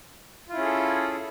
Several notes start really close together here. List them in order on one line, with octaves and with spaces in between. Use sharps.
F4 E4 C#4 G#4 A4